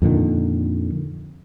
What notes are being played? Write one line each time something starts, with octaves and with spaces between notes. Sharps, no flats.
F2 A#2 D3 D#3